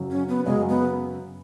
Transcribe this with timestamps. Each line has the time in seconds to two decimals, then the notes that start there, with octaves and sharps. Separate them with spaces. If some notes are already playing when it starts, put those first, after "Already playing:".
Already playing: F#1 F#2 C#3 F#3
0.11 C#4
0.29 B3
0.45 F#1 F#2 C#3 F#3 G#3
0.69 B3